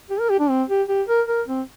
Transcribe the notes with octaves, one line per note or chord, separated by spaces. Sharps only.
G4
A#4
G4
D4
C4
G4
G4
A#4
A#4
C4